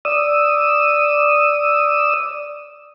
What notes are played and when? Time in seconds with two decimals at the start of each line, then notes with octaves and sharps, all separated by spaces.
0.05 D5 D#6 E6